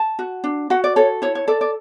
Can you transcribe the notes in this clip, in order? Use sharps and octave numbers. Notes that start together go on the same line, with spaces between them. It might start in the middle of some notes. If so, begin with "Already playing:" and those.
Already playing: A5
F#4
D4
F#4 F#5
D5
A4 C#5
E4 C#5
C#5
A4 D5
D5